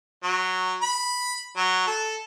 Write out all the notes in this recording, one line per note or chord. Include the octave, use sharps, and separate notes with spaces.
F#3
B5
F#3
A4